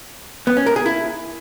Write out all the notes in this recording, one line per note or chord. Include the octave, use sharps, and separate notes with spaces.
B3
C#4
A#4
G#4
E4